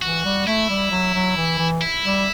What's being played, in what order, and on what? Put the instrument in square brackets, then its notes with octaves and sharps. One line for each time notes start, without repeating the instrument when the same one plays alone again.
[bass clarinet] E3 [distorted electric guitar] F#4
[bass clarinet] G3
[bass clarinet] A3 [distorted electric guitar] E4
[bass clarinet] G3
F#3
F#3
E3
E3
[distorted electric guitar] E4
[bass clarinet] G3